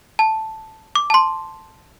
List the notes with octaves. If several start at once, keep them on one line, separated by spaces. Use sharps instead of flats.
A5
D6
A5
C6